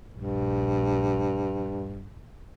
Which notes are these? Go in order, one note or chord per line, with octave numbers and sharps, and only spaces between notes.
A#1 G2